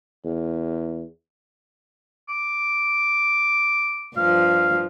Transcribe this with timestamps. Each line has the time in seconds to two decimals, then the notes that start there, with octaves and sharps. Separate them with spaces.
0.25 E2
2.29 D6
4.17 G2 F3 F5